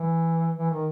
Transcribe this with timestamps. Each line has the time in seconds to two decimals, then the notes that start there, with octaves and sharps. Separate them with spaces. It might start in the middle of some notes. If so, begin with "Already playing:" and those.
Already playing: E3
0.57 E3
0.71 D#3